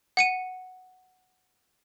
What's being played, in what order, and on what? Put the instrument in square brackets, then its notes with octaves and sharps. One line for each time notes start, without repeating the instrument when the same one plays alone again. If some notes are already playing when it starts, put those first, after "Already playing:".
[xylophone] F#5 C#7 D#7